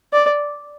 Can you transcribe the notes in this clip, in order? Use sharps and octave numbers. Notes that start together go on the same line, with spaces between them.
D5